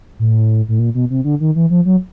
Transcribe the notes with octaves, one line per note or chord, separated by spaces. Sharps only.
A2
A2
A#2
B2
C3
D3
D#3
E3
F3
F#3